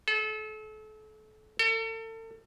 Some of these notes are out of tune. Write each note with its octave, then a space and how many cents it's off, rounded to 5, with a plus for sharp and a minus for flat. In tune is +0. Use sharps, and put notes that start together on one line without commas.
A4 -35
A4 +35